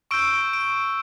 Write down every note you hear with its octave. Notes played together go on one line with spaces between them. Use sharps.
C#6 E6 G6 D7
D7